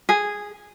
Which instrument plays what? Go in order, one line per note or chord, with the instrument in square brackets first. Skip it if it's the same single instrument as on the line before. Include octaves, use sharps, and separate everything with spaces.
[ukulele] G#4